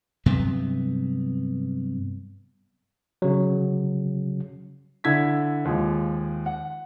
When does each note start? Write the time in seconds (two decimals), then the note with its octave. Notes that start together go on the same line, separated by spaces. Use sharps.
0.26 G2 C3 F#3 B3
3.22 C#3 F#3
5.04 D3 E4 G#6 B6
5.65 D#2 F3 G#3
6.46 F#5